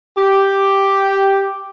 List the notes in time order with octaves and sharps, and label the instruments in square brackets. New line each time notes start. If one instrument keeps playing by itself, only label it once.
[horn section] G4